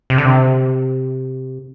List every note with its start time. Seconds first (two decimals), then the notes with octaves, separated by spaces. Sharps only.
0.10 C3
0.18 D3
0.25 C3